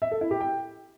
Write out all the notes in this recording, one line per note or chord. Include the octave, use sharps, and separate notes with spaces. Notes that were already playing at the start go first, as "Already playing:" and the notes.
E5
A4
E4
G4
G5